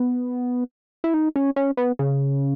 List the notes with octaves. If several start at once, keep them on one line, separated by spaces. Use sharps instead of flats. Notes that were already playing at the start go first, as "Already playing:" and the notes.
Already playing: B3
E4
D#4
C#4
C#4
B3
C#3